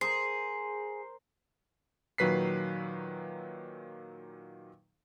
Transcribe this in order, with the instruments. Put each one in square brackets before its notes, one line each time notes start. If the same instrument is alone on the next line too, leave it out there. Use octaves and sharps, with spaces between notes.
[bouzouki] G#4 [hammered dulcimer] A#4 C5 [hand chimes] C7
[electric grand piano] A#2 D#3 F#3 B4 B6 C7